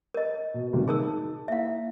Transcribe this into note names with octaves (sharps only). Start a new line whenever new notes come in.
A#4 D#5
B2
G#1 C3 G3
D#4 G#4 A#4 A5 E6
A#3 E4 E5 F5